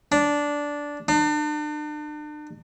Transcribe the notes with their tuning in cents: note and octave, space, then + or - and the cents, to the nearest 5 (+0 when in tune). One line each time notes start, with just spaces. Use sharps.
D4 -10
D4 +40